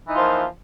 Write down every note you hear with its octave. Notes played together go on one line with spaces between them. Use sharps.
E3 F3 A#3 D#4 F4